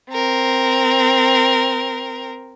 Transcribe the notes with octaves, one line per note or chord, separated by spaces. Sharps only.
C4 A#4